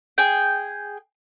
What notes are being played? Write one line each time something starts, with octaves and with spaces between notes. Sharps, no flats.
G#4 G5